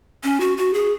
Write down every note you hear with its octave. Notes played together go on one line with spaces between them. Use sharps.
C#4
F#4
F#4
G#4